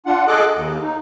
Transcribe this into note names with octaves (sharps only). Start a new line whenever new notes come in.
D4 F4 F#5
G#4 A4 D#5 D6 F#6
D#2
D#4